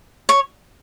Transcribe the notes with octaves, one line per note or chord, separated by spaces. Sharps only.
C#5